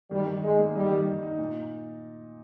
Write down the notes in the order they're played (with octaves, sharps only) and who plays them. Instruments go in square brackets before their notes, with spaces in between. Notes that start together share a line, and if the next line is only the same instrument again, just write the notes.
[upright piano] D#3 [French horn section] G3
[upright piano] D#3
[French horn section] G#3 [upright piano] D#4
[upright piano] A#3
[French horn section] G3 [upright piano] D#4
[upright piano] D#3
D#3
D#4
A#2